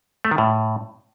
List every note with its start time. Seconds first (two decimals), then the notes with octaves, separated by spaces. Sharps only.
0.25 A3
0.31 D#3
0.38 A2